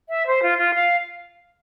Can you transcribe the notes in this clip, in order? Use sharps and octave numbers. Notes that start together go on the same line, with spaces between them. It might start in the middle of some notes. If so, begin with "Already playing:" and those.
E5
C5
F4
F4
F5